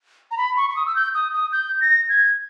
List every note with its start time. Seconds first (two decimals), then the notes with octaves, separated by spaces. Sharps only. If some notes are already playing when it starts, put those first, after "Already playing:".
0.31 A#5
0.38 B5
0.57 C#6
0.70 C#6
0.76 D#6
0.86 E6
0.96 G6
1.15 D#6
1.34 D#6
1.52 G6
1.81 A#6
2.09 G#6